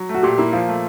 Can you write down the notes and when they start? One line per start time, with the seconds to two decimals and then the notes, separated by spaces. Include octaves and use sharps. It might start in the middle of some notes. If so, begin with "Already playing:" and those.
Already playing: F#3
0.09 A3
0.14 F#4
0.23 A#2 G4
0.38 A#3 E4
0.52 F3 F4
0.68 A3